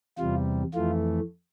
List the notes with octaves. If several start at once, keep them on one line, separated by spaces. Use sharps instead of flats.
E2 C3 G3 F4
F2 E3 A3 F4